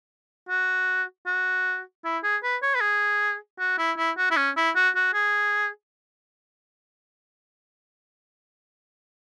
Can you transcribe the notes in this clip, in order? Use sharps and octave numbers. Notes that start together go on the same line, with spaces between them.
F#4
F#4
E4
G#4
B4
C#5
B4
G#4
F#4
E4
E4
F#4
E4
C#4
E4
F#4
F#4
G#4